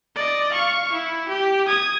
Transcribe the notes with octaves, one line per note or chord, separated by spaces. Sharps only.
D5 D#5
F5 C#6
E4
G4
D#6 G#6